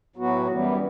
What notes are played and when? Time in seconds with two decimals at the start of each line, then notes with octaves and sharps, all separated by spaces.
0.16 A2 F#3 B3 F#4
0.47 F#2 E3 G3 B3